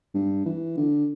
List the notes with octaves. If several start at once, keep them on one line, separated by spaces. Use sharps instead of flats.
G2
E3
D3